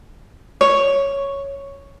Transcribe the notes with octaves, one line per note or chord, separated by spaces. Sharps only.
C#5